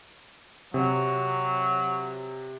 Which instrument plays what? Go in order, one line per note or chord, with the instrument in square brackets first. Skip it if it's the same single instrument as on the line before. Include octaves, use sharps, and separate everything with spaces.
[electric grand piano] C3 [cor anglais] F#3